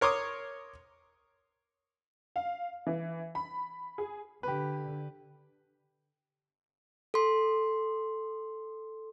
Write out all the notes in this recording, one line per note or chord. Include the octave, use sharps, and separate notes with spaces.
A#4 C#5 C6 D6 D#6
F5
E3
B5
G#4
D3 G4 B4
A4 C6